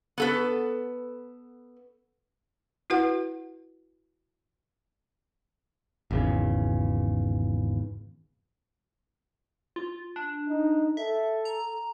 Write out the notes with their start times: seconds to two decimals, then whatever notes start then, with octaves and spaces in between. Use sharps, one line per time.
0.18 B3 A4 B4
2.90 E4 F#4 B4 F#5
6.11 G#1 E2 C#3
9.76 F4
10.16 D4
10.49 D#4
10.97 A4 E5
11.45 A#5